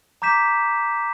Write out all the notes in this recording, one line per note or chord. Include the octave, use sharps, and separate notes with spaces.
A#5 D6 G6 B6 E7